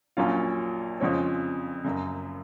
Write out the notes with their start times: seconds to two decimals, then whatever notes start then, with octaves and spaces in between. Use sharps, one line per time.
0.17 A#1 A#2 F#3 C#4 F4 F5
1.00 F2 C#3 F3 G#3 C4 C#5
1.84 F#1 F#2 C#3